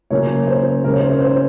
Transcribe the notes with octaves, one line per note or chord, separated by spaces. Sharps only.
C#3 F#3 A#3 C#4 C#5
C5
C#3 G#3 C#4 A#4
C#5
C5
C5